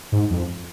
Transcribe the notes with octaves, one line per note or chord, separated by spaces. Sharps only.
G#2
F2